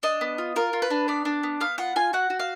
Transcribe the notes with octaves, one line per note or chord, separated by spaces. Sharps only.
D4 D#5
B3
F4
F4 A#4
F4
B4
D4
B3 D5
D4
B3
B3 F5
F4 F#5
F4 G#5
F#4 F#5
F#4
F5